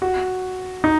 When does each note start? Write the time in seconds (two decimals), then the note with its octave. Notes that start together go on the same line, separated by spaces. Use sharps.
0.02 F#4
0.84 D#4